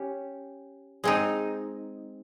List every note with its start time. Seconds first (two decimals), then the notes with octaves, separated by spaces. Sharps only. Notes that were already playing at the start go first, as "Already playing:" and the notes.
Already playing: C#4 G4
1.04 G#3 C4 D#4